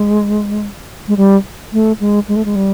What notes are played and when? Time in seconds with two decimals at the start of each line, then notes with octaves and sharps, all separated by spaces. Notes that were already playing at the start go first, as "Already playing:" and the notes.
Already playing: G#3
1.08 G#3
1.17 G3
1.73 A3
2.00 G#3
2.28 G#3
2.36 A3
2.45 G#3
2.56 G3